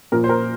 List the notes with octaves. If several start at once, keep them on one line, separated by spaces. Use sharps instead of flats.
A#2 F3 A#4
C5
A#4